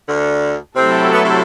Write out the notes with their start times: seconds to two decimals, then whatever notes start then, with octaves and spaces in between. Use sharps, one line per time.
0.09 D2 D3
0.75 C3 F#3 A3 C4 E4 A4
1.13 B3
1.25 C3 C4